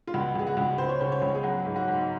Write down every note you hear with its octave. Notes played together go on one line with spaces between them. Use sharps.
F4
C#2 F#4
C#2 G#4
F#4
C#2
C#2 C5
C#5
C#3 C5
C#5
C#2
G#4
F#3 F#4
G#2
F#4
G#2